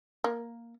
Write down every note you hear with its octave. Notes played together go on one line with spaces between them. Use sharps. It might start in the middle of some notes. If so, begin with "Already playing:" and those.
A#3